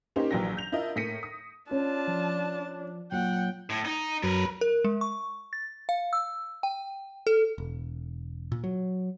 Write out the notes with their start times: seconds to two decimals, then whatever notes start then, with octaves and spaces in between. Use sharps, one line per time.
0.16 A#3 C#4 D#4 G4 C5
0.31 A#1 E3 F#3 G5 A#6
0.57 G6 F7
0.72 D4 E4 F4 A#4 D#5
0.96 A2 A#3 A#6 B6 C#7 D#7
1.23 D#6
1.71 C#4 D4 F4 A5
2.08 F3
3.12 A#2 F#3 F#5 G5
3.70 A2
3.85 D#4
4.23 F#2 F#3 A#4 B4
4.61 A#4
4.84 G#3
5.01 C#6
5.53 A6
5.89 F5
6.13 E6
6.63 G5
7.27 A4
7.58 E1
8.52 A#2
8.64 F#3